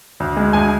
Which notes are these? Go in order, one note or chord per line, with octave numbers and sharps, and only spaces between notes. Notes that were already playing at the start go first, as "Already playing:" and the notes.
D2
G#3
D2 G#5